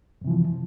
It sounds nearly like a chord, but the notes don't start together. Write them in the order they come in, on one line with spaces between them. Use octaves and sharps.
F#2 C3 E3 F3